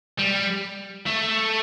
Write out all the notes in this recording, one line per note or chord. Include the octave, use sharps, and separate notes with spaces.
G3
A3